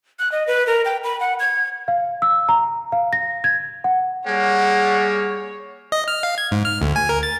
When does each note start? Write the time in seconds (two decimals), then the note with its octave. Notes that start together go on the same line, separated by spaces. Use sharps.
0.19 F#6
0.32 D#5
0.47 B4
0.67 A#4
0.85 G5
1.04 B5
1.20 F#5
1.40 G#6
1.88 F5
2.22 E6
2.49 A#5
2.92 F5
3.13 A#6
3.44 G#6
3.84 F#5
4.27 G3 A#3 G#4 C#5 F#5
5.92 D#5
6.08 F6
6.23 F5
6.38 G#6
6.51 G#2
6.65 F6
6.82 D2
6.96 G#5
7.09 A#4
7.23 A6